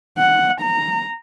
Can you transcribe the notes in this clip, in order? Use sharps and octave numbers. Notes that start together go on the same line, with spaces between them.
F#5
A#5